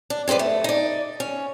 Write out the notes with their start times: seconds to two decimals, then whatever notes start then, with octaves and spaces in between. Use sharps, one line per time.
0.10 D4
0.28 G#2 C4 C#4 B4 D5
0.39 A3
0.64 D#4 D5
1.20 C#4